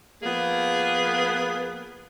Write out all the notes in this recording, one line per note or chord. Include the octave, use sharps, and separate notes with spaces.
F3 A#3 B3 G#4